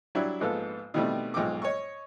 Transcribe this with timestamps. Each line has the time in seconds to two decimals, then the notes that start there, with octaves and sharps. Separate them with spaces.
0.15 F#3 G3 D4 E4
0.40 A#1 G#2 B3 A4 F5
0.94 B2 D#3 E3 G3 A3 C4
1.34 B1 G#2 F3 G5 D6
1.62 C#5 D#5 C#6